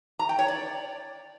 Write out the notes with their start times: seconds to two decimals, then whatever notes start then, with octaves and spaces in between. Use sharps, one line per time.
0.19 A#5
0.29 G5
0.39 C#5
0.48 D5